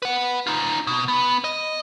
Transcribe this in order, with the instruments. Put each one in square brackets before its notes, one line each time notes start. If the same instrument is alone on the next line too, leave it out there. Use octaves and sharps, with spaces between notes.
[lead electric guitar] B4 F#5
D#4 F4
B2
B3
D#5